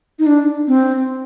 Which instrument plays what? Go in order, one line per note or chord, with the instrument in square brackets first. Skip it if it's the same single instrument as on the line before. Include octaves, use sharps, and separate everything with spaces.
[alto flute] D#4
D4
C4